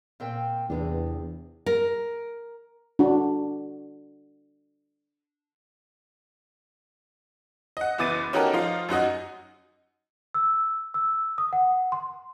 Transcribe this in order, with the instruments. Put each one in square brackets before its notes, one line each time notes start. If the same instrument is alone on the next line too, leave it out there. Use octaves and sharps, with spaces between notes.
[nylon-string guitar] A#2 C4 G5
[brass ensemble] E2 [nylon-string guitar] C3 B3 D4
[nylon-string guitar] A#4
[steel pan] D4 F#4
[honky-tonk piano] D#5 F#5
F#1 E3 B3 D6 A6 D#7
C#4 D#4 F#4 G4 A4 A#4
F3 D#4 F4
F#2 D#4 F#4 D#5
[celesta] E6
E6
D#6
F#5
C6